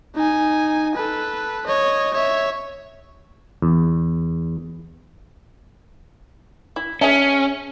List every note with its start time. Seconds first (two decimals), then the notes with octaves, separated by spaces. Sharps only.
0.15 D#4 G#5
0.95 A4 B4
1.67 C#5 D#5
2.14 C#5 E5
3.62 E2
6.76 E4
7.01 C#4 G#4 E5 A5